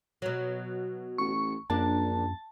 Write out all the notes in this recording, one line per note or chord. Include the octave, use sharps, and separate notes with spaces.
B2 F#3
A1 C#6
A#1 F#2 A#3 D4 A5